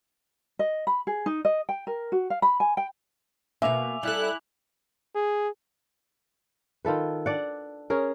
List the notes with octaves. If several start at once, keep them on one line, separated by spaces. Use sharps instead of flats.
D#5
B5
G#4
D#4
D#5
G5
A#4
F#4
F5
B5
G#5
G5
B2 A#3 E5 G#5 D6 F7
G3 E4 A4 F#6
G#4
D#3 F4 A4 B4
D4 D5 F#5
C#4 G#4 A#4